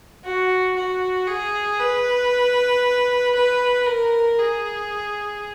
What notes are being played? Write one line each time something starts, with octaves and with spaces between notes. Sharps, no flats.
F#4
F#4
G#4
B4
B4
A#4
G#4